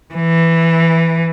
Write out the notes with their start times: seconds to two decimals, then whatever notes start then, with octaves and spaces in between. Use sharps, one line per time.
0.14 E3